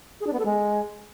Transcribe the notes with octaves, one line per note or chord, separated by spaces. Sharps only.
G#4
D4
B3
A4
G#3